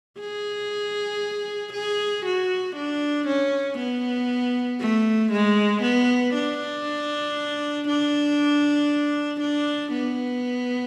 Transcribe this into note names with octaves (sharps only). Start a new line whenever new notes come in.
G#4
G#4
F#4
D4
C#4
B3
A3
G#3
B3
D4
D4
D4
B3